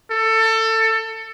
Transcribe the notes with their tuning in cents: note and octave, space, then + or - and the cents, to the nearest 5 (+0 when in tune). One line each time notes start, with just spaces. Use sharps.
A4 +20